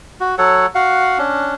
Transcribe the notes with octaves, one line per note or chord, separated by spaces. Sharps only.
F#4
F#3 A4 C#5 F#5
F#4 F5 F#5
C#4 D4